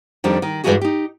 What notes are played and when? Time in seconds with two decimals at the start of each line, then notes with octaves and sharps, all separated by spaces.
0.24 F2 D#3 G3 D4
0.42 D#3
0.64 G2 D#3 E3 G#3 F#4 G#4
0.81 D#4 G4